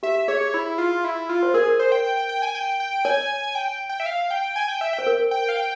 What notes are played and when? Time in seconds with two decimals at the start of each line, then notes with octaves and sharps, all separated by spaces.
0.03 G4 E5
0.28 G#4 C#5
0.54 E4
0.78 F4
1.04 E4
1.29 F4
1.43 C5
1.54 G#4 A#4
1.79 C5
1.92 G5
2.04 G5
2.17 G5
2.29 G5
2.42 G#5
2.55 G5
2.80 G5
3.05 C#5 G#5
3.55 G5
3.89 G5
4.00 E5
4.06 F5
4.31 G5
4.56 G#5
4.68 G5
4.81 E5
4.93 G5
4.99 C5
5.07 A#4
5.31 G5
5.49 F5
5.56 G5